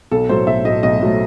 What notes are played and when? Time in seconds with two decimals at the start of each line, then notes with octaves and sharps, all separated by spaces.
0.11 B1 A4
0.29 A2 F#3 A3 C5
0.47 B1 E5
0.65 A2 F#3 A3 D#5
0.83 B1 D#5
1.01 A2 F#3 A3